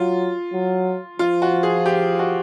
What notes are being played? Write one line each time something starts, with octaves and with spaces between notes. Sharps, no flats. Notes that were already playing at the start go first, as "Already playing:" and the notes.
Already playing: F#3 F4
F#3
F3 F4
F#4
G#4
G4
F#4